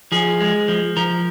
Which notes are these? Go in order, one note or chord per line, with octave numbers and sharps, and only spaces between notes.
F3 G#4
G#3
F3
F3 A#4